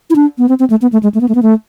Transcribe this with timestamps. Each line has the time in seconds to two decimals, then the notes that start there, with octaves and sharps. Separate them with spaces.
0.10 E4
0.16 D4
0.38 B3
0.49 C4
0.59 C4
0.70 A3
0.82 B3
0.93 A3
1.03 G#3
1.14 A3
1.21 B3
1.29 A3
1.35 B3
1.43 A3